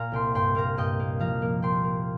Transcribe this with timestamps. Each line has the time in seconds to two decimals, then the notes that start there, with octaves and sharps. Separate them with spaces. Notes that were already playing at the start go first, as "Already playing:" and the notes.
Already playing: A#2 A#3 F5 A#5
0.12 C2 G5 C6
0.34 G2 G5 C6
0.55 A#3 F5 A#5
0.77 G2 D#5 G5
0.99 A#3
1.20 F3 F5 A#5
1.42 A#3
1.62 A#3 G5 C6
1.84 A#3